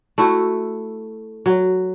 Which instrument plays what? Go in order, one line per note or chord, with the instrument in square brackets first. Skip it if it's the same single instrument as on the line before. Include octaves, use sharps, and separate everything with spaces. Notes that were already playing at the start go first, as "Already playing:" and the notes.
[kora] A3 E4 F#4
F#3